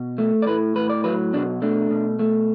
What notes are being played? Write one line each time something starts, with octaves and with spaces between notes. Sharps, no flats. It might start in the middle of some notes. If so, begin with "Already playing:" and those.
Already playing: B2
A3
D5
A2 B4
A2 B4
D5
F#3 B4
B2 D4
A3 D4
B2
A3